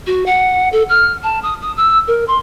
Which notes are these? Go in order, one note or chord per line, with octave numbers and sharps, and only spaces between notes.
F#4
F#5
A4
F6
A5
D#6
D#6
E6
A#4
C6